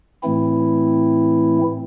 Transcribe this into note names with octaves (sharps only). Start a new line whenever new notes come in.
A2 E3 A3 C4 E4